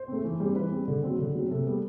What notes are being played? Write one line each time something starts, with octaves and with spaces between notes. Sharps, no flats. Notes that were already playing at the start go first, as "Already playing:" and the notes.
Already playing: C5
A3 C4
E3
G3 C4
E3 B4
G3 C4
D3
F#3 C4
D3
F#3 C4
C3 A4
G3 B3